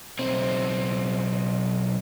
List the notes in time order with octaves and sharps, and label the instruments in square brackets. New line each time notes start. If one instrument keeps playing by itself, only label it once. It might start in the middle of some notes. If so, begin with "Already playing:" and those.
[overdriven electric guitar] B1 C4